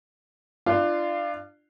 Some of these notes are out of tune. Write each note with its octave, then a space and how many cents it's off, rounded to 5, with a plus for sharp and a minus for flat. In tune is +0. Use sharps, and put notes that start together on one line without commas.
D4 +20 F4 -20